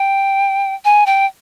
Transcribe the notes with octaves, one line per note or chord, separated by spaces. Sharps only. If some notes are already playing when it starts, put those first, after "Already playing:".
Already playing: G5
G#5
G5